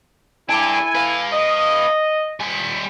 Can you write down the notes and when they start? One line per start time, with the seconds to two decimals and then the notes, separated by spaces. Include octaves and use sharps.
0.49 D4 E4 G4 A4 G#5
0.95 B4 F5
1.33 D#5
2.40 G3 G#5